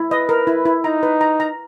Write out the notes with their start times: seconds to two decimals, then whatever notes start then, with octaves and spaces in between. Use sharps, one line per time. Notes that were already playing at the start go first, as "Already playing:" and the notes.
Already playing: E4
0.11 B4 D#5
0.29 A#4
0.47 E4
0.65 E4
0.84 D#4 A#5
1.03 B4
1.21 A#5
1.40 A#5